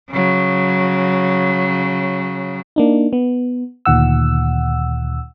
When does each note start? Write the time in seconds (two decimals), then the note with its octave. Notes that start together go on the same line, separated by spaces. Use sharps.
0.10 C#3 F#3
2.76 A#3 D4 D#4
3.13 B3
3.85 D2 A#2 D#3 F#5 E6